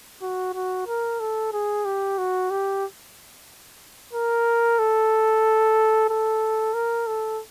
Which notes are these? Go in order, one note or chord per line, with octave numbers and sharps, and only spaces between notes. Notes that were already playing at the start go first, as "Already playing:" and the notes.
F#4
F#4
A#4
A4
G#4
G4
F#4
G4
A#4
A4
A4
A#4
A4